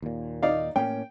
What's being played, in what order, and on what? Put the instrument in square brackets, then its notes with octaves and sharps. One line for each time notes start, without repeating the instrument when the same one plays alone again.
[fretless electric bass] D#2 A#2
[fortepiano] D#4 D5 F5
[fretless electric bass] A2 A#3 C#4 [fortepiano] G5